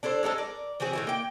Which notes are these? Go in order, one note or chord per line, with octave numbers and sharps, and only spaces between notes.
D4 E4 A4 C5
G#3 D#4 E4 A4
A#4 D5
E3 C4 F#4 G#4
A2 D#3 E4
A#3 G5